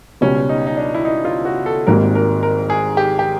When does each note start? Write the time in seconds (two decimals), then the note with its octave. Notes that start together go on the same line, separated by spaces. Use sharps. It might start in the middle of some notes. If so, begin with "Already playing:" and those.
0.21 C#2 B2 G3 C#4
0.49 D#4
0.67 D#4
0.77 D4
0.94 E4
1.05 D#4
1.25 F4
1.45 F#4
1.66 A4
1.87 G#1 G#2 D#3 G3 A#3 A#4
2.15 A#4
2.43 A#4
2.70 G#4
2.97 G4
3.19 G4